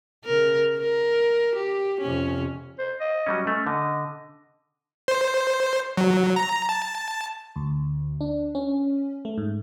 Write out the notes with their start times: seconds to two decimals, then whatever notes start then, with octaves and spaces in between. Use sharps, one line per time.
0.25 C#3 A#4
0.79 A#4
1.56 G4
2.01 F2 C3 C#4
2.79 C5
3.00 D#5
3.26 F#3 G3 C#4
3.47 A3 C#4
3.67 D3 D#5
5.08 C5
5.97 F#3
6.36 A#5
6.69 A5
7.56 D2
8.21 D4
8.55 C#4
9.25 A3
9.38 G#2